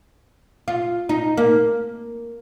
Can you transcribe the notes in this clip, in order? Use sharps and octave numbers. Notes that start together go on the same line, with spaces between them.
F4
D#4
A#3